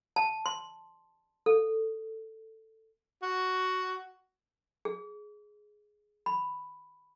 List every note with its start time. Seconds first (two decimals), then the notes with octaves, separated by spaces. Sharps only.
0.16 A5
0.46 C6
1.46 A4
3.22 F#4
4.85 G#4
6.26 B5